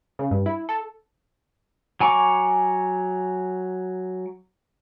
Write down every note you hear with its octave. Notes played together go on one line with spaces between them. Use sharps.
C#3
G2
E4
A4
F#3 G#5 A#5 C#6 D6